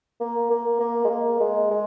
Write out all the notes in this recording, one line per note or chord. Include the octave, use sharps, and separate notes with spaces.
A#3
A#3
A#3
G#3
A#3
G#3
G#3